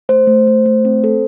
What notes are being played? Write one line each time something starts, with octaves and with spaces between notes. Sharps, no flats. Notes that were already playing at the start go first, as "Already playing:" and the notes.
A3 C5
A3
A3
A3
C4
A4